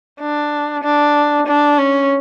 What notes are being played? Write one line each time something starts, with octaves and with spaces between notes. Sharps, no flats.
D4
D4
D4
C#4